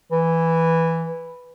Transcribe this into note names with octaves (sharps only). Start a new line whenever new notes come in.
E3